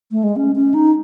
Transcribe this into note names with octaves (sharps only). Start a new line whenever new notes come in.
A3
G#3
C#4
C#4
D#4